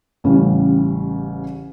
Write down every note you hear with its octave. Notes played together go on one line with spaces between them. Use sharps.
A1 C#3 E3 G3